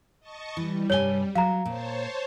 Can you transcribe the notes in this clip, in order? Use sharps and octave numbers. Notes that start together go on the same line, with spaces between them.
D#5 A5 C#6
E3 G3
G2 C3 C#5 G#5 G7
F#3 F5 A#5
A#2 C5 C#5 A5